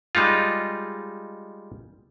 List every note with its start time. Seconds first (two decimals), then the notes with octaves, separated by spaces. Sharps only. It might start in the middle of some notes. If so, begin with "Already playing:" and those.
0.15 G3 G#3 D#4 F4